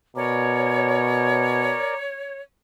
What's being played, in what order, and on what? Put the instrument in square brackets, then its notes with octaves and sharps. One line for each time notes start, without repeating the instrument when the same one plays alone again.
[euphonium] B2 [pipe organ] A#4 D5 [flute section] C#5